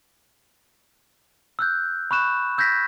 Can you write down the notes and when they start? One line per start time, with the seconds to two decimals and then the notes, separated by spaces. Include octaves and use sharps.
1.59 E6 F#6 G6
2.11 B5 C#6 F#6 E7
2.58 E6 G6 G#6 A#6 B6